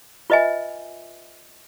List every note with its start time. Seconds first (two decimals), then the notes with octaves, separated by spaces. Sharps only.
0.30 F4 B4 D#5 E5 G#5